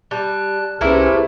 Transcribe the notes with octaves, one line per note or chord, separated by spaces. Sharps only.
G3 A5 F#6
C2 C3 A3 A#3 C#4 E4 G#4 B4